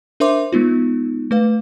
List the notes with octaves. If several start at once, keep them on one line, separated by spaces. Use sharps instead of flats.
D4 A#4 C5 E5 C6 D6
G#3 B3 D#4 F4
A3 B4 F5